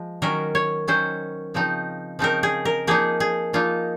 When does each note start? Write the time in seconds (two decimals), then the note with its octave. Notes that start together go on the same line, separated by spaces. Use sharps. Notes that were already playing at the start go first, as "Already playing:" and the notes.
Already playing: F3 G#3
0.22 D#3 F#3 C#4 A#4
0.55 C#5
0.88 D#3 F#3 C#4 C5
1.54 C#3 F3 C4 D#4
2.19 C#3 F3 C4 D#4 A#4
2.43 G#4
2.65 A#4
2.87 F3 A#3 D#4 G#4
3.20 G#4
3.53 F3 A#3 D#4 F4